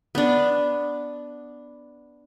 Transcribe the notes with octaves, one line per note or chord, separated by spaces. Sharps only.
B3 D4